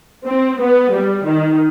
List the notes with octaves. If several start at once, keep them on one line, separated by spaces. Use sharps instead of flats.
C4
B3
G3
D#3